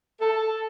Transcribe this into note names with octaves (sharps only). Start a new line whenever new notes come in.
A4